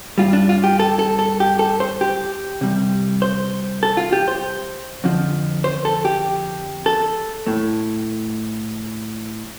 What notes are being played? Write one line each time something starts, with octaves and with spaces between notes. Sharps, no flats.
G2 G3 F4
D4
F4
G4
A4
A4
A4
G4
A4
C5
G4
C3 G3
C5
A4
F4
G4
C5
F2 D3 F3
C5
A4
G4
A4
A2 A3